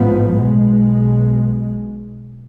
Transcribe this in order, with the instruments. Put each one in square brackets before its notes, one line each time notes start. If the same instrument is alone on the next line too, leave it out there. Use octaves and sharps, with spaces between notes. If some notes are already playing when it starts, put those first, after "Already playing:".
Already playing: [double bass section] A1 G#2 F3 B3
B1 B2 G#3